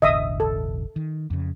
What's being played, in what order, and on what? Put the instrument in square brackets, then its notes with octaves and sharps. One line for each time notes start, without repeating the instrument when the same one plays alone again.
[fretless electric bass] E1 A1 D3 [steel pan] D#5 E5 D#6
[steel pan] A4
[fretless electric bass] D#3
F2 C#3